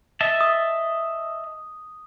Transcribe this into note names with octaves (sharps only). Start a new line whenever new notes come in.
D#5 E5 A5
D#6